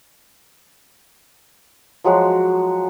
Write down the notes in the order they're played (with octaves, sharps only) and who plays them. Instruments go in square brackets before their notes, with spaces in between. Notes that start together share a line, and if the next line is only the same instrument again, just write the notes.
[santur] F3 F#3 G#3 F#4